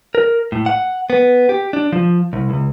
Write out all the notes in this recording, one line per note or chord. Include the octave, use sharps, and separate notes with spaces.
A#4
A2
F#5
B3
G4
D4
F3
C2
C#2